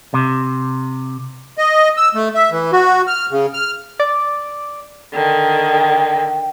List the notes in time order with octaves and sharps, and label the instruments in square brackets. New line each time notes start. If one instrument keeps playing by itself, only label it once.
[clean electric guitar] C3
[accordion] D#5
E6
A3
E5
E3
F#4
F6
C#3
F6
[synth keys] D5
[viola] D3 D#3 [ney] G5